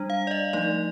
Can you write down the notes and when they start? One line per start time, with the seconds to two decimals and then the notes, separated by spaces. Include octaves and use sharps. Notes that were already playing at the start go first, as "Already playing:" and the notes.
Already playing: G3 D4
0.10 F5
0.27 D5
0.31 D#5
0.53 F3 A3 D#4 D5